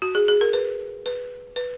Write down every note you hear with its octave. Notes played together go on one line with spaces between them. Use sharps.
F#4
G#4
G#4
A#4
B4
B4
B4